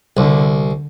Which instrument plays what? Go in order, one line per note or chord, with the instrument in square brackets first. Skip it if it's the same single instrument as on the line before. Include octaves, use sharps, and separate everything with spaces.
[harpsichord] C2 [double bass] D3